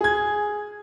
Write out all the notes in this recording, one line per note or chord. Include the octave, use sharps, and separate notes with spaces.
G#4 G#6